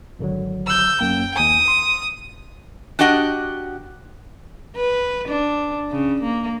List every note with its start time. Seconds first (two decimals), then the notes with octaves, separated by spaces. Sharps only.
0.19 G#1 D3 F#3
0.67 E6 G6
1.01 F#2 A#3 G5
1.36 D#2 G#5 D#6
1.68 C6
2.99 D4 F#4 G4 D#5 F#5
4.76 B4
5.28 D4
5.92 C#3
6.23 A#3